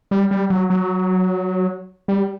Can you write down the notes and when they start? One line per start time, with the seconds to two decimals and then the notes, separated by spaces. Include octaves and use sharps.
0.11 G3
0.31 G3
0.50 F#3
0.70 F#3
2.08 G3